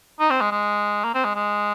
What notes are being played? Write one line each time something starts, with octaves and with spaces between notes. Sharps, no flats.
D#4
C4
G#3
G#3
A#3
C4
G#3
G#3